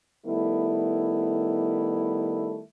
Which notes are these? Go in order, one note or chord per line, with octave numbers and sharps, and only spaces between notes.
D#3 G3 A3 B3 E4